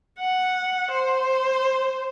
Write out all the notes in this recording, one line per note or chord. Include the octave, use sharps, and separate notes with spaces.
F#5
C5